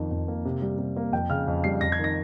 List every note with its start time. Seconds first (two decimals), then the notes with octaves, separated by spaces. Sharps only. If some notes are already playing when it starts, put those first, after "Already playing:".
Already playing: F2 D#3
0.11 F2
0.28 A#3
0.45 C3
0.62 G3
0.79 C3
0.96 A#3
1.13 F2 G5
1.30 C#3 F6
1.48 F2
1.64 G3 C7
1.81 F2 A#6
1.92 G#6
1.99 D#3 A#6